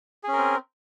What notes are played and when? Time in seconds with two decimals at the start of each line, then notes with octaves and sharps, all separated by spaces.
0.24 G#4
0.28 C#4
0.33 A#4
0.38 C4